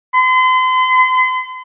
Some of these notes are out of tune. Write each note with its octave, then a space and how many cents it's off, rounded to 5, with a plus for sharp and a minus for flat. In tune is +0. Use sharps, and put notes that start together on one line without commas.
C6 -40